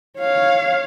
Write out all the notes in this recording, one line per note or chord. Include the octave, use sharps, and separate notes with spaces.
C#5 F5